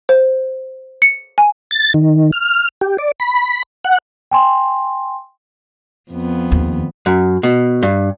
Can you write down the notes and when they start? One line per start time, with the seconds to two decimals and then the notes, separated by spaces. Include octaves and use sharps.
0.09 C5
1.02 C#7
1.38 G#5
1.71 A6
1.94 D#3
2.32 F6
2.81 G4
2.98 D5
3.20 B5
3.85 F#5
4.31 G5 G#5 C6
6.11 F2 B3
6.52 D#2
7.06 F#2
7.43 B2
7.83 G2